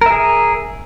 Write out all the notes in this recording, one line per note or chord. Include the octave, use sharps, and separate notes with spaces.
G#4 A#4 E5